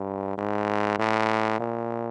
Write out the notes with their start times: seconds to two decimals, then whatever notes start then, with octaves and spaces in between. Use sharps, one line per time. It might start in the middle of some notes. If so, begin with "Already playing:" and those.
Already playing: G2
0.38 G#2
0.99 A2
1.60 A#2